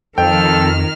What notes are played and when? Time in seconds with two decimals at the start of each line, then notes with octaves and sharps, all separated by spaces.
0.18 F2 D#3 A4 G5 F6